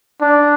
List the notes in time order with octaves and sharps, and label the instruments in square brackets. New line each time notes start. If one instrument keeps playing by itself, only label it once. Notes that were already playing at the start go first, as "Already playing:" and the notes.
[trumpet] D4